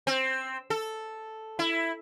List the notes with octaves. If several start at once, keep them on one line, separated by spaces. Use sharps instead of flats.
C4
A4
E4